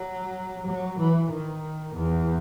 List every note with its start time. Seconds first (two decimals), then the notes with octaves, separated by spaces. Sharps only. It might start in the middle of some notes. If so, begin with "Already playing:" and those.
Already playing: F#3
0.66 F#3
0.99 E3
1.31 D#3
1.95 E2